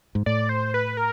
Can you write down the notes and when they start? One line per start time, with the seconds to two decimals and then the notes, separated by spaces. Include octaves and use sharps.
0.15 G#2
0.26 A2 D5
0.49 C5
0.74 B4
0.97 A#4